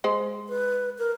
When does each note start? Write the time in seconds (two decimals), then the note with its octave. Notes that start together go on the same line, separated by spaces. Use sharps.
0.04 G#3 C5
0.49 B4
0.99 A#4